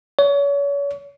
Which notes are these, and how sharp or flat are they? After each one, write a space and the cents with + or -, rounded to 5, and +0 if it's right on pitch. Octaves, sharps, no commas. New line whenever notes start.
C#5 +35